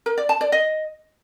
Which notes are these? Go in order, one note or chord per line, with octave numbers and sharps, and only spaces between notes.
A#4
D5
A5
D5
D#5